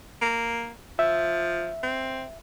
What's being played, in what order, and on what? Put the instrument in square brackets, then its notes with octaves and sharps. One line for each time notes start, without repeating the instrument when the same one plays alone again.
[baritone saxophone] A#3
[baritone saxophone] F3 [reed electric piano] E5
[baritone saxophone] C4